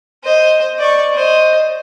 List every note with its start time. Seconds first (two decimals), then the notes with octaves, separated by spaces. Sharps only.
0.24 C5 D#5
0.79 D5 C#6
1.14 C5 D#5